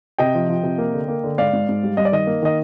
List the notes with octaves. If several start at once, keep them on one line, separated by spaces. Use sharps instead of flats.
C3 D#5 G5
F3
F3
C3
A#3
D3
A#3
D3
G#2 D5 F5
G#2
G#2
G3
G2 D#5
D5
D#3 D#5
A#3
D#3 D#5